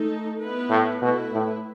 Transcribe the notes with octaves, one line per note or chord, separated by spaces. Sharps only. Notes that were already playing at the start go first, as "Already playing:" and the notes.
Already playing: A3 D#4 A4
B3 E4 B4
A2
B2 A3 E4 B4
A2